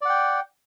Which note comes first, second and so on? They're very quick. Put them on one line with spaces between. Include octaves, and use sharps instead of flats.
D5 F#5 G5